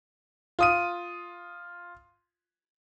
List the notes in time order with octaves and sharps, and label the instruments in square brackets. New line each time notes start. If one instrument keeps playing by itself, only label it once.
[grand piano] F4 D#6 D#7